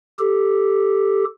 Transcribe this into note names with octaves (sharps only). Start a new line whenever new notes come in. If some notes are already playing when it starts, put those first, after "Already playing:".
G4 A4